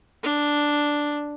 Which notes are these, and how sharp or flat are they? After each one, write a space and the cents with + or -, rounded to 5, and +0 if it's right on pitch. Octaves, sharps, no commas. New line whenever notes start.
D4 +0